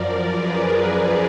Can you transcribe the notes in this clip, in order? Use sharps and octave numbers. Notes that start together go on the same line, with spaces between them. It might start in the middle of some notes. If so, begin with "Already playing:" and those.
Already playing: F#2 F3 A#4 D5
G#4 B4